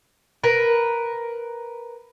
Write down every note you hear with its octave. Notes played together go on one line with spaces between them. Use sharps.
A#4 B4